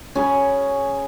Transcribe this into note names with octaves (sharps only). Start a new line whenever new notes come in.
C#4 G#4 B5